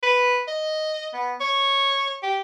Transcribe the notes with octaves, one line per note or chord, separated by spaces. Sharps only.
B4
D#5
B3
C#5
G4